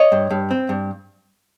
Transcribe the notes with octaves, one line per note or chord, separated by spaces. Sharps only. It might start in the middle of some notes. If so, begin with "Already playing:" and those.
Already playing: C#5 D#5
G2
G2
C4
G2